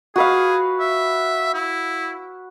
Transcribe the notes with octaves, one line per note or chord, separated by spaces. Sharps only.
F#4 G#4 B4 F5
E5
E4